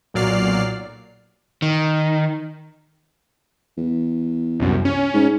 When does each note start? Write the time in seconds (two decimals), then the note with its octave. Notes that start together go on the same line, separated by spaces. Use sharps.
0.14 B1 A#2 F#3 D5 F6 C7
1.62 D#3
3.78 E2
4.60 C2 F#2
4.85 C#4
5.14 G#2